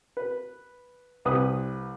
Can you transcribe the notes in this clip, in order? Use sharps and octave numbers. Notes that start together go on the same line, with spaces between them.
B4
C2 B4 D#6